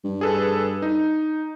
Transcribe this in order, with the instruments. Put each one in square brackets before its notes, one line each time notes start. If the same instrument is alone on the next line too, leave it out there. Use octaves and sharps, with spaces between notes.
[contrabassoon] G2
[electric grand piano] G#4 A4 B4
D#4